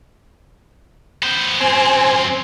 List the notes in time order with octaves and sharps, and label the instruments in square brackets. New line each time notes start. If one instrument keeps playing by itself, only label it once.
[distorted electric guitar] B3 C5
[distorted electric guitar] F#2 C4 [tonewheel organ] C5 G#5